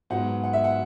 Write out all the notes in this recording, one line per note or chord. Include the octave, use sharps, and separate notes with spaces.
G#2 F#3 B3 F#5
F#5
E5
F#5